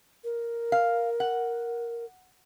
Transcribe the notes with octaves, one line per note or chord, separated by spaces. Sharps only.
A#4
F5
F#5